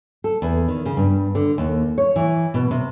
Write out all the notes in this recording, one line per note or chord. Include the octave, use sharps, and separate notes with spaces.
A4
E2
D#3
C#3
G2
D3
D#2
C#5
E3
B2
C3